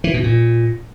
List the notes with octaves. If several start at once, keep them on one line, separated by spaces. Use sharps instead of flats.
E3
B2
A#2